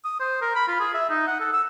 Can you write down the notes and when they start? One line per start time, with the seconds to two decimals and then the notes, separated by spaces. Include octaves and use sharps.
0.04 D#6
0.20 C5
0.42 A#4
0.56 B5
0.68 F4
0.80 G#4
0.94 E5
1.10 D#4
1.27 F#5
1.40 A4
1.53 E6